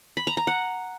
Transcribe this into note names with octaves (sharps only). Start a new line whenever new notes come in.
B5
A#5
A#5
F#5